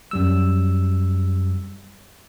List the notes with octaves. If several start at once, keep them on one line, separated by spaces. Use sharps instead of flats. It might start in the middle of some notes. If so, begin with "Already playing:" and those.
F#2 G3 E6